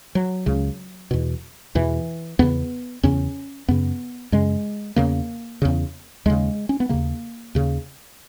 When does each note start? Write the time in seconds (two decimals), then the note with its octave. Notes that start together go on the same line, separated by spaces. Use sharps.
0.15 F#3
0.46 C#2 C#3
1.11 E2 B2
1.75 E2 B2 E3
2.39 E2 C#3 B3
3.03 E2 C#3 C#4
3.68 F#2 C#3 B3
4.32 F#2 C#3 G#3
4.96 E2 C#3 A#3
5.62 E2 C#3
6.26 D#2 C#3 G#3
6.69 C#4
6.80 B3
6.89 D#2 C#3 A#3
7.55 D#2 C#3